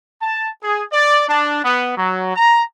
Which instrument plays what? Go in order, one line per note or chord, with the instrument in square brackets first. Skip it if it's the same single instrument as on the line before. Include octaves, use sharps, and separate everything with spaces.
[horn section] A5
G#4
D5
D4
B3
F#3
A#5